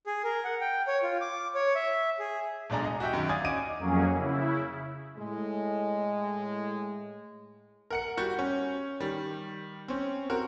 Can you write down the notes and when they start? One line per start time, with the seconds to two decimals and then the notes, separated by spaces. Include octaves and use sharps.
0.07 G#4
0.24 A#4
0.45 F#5
0.61 G5
0.88 C#5
1.03 F4
1.21 D6
1.55 C#5
1.75 E5
2.19 G#4
2.70 D1 B1 G#3 D4 G#4 A#5
2.84 D#5
3.00 F#4 G4 E5 G5
3.13 F#2 D#3
3.29 D5 F5 G#5 D#6 G#6
3.45 C#4 D#5 D6 D7 D#7
3.79 F2 F#3 A#3 C#4 G#4
4.12 C#3 E4
5.17 A2 G#3
7.90 A#4 F#5 C#7
8.17 G3 F#4 G6
8.39 C#4
9.00 D#3 G3
9.88 C4 C#4
10.30 C4 F#4 A#4